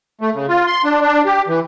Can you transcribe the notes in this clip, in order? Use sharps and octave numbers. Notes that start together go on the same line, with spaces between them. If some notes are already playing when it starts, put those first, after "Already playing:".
A3
C#3
F4
C6
D4
D4
G4
E3